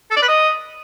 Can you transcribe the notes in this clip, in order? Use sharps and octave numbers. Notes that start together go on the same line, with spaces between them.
A4
D5
B4
D#5